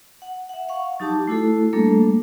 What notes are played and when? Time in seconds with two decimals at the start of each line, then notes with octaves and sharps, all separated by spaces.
0.22 F#5
0.49 E5 F#5
0.68 F5 F#5 C#6
1.00 F#3 D#4 G4 A5 D6
1.27 A3 E4 F#4 A4
1.73 G3 A3 A#3 D4 A4